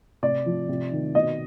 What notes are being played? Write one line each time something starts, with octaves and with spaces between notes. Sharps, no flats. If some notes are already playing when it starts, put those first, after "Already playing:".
C3 D5
F3
C3
D#3
B2 D#5